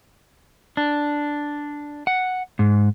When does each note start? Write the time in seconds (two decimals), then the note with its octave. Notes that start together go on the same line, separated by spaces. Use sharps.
0.77 D4
2.07 F#5
2.59 G#2